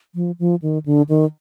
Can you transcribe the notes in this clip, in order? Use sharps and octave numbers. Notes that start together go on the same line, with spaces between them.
F3
F3
D#3
D3
D#3